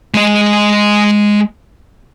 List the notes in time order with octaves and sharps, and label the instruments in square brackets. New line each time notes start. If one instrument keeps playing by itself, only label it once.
[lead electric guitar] G#3 D#5